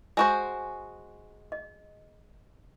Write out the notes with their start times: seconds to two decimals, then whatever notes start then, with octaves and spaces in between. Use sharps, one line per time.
0.17 G#3 F#4 C5 G#5 A#5 C#6
1.52 D#5